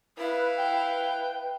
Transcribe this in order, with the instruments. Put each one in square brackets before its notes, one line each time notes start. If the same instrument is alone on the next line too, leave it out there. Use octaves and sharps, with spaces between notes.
[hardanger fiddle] E4 F5 [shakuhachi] B4
[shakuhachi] B4 [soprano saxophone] G5